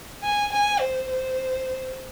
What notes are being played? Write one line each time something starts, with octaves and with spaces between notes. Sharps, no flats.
G#5
G#5
C5
C5